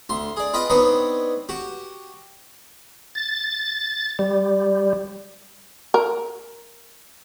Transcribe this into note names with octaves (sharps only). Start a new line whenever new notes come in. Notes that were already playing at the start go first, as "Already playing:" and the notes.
D2 C6
G#4 D5
F4 B4 D#5 G5
B3 C4 D4 D#4 B4 C#5
F#4 G4
A6
G3
A#4